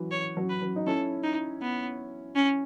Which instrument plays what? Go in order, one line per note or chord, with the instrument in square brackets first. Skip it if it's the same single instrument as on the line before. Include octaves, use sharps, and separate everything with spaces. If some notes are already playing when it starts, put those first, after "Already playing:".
Already playing: [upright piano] E3 F#3
[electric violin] C#5
[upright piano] F#3
[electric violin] B4
[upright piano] F#3
D#4
[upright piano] C#4 E4 [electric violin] A4
[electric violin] D#4
B3
C#4